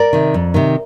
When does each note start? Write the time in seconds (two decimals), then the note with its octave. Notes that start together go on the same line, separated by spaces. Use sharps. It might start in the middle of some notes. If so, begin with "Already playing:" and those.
Already playing: A#4 D5
0.13 C3 D#3
0.34 F2
0.54 C3 D#3